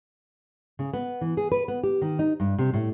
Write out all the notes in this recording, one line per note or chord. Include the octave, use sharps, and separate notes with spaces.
C#3
B3
E3
G#4
B4
B3
G4
D#3
D#4
G2
C3
A2